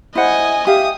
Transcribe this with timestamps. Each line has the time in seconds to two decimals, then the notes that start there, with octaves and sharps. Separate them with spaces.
0.15 E4 C5 D#5 F#5 G#5
0.67 G4 E5 F5 D#6